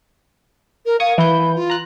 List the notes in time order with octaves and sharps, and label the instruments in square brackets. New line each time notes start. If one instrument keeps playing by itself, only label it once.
[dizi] A#4
[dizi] F5 [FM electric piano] C#6 D#6 G#6
[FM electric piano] E3 G6 [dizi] B5
[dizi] F4
[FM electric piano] A#5 F#6